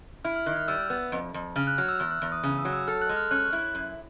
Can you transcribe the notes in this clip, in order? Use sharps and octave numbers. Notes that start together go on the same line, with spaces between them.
E4 F6
F6
D#3 F#6
F6
G3 E6
B3
F2
F2
C#3 F6
F#6
F#3 F6
E6
E2 F6
F#6
E2
D#6
C#3 D#6
E6
F#3
E6
A4 F6
F#6
G#3
F6
C#4 F#6
E4
F#2